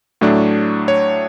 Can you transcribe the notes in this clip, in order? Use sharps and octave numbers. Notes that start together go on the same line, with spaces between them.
A2 F#3 A3 D4
C#5